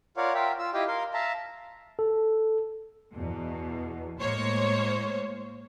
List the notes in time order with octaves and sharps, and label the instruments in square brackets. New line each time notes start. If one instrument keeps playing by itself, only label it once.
[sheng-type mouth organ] F4 A#4 C#5 D5 F5 F#5
F4 A#4 E5 F5 G5
F4 E6
E4 G4 D#5 F5 G5
A#4 F5 C6
E5 F5 A5 A#5
[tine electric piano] A4
[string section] E2 B2
A2 G#3 A#3 C5 C#5